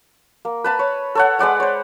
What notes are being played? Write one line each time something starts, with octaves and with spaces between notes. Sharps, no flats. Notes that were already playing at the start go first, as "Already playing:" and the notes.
A#3
B4 A5 B5
C#5
A4 C#5 F#5
G#3 B4 D5 F#5
C5 C#5